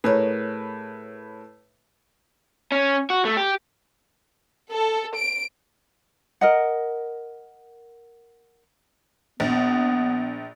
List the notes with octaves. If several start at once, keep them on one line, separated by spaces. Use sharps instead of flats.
A2 G#4 A#4 B4 C#5
C#4
F#4
A3
G4
A4
D7
A#4 D#5 F#5
A#1 B3